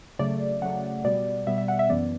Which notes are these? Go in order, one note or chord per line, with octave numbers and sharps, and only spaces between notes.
C#3 F#3 A3 D5
C#3 F#3 A3 F#5
B2 G3 B3 D5
B2 G3 B3 E5
E5
F#5
E5
F#2 E3 B3 D5